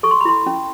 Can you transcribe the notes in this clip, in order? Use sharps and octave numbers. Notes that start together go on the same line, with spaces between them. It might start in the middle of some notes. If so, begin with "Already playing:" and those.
A4 C#6
C6
B5
E4 C6
C#4